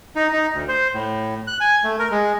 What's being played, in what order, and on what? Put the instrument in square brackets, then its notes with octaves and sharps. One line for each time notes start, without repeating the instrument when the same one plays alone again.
[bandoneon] D#4
D#4
D2
C5
A2
F#6
G#5
A3
A#4
G#3